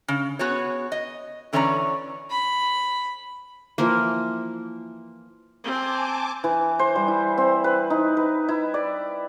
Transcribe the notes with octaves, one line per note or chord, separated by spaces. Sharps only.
C#3
B3 F#4 G#4 C#5
D#5
D3 E3 C#4 C#5 D5 A#5
B5
E3 F3 A#3
C4 G#5 A5 D6
E3
C5
G3
E4
C4
B4
D#4
B4
E4
D5